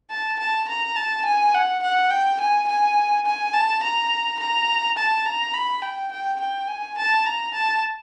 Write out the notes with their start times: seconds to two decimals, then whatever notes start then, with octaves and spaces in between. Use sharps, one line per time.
0.10 A5
0.39 A5
0.68 A#5
0.96 A5
1.25 G#5
1.54 F#5
1.83 F#5
2.10 G5
2.40 G#5
2.68 G#5
3.26 G#5
3.53 A5
3.82 A#5
4.39 A#5
4.97 A5
5.25 A#5
5.53 B5
5.82 G5
6.12 G5
6.40 G5
6.68 G#5
6.97 A5
7.26 A#5
7.54 A5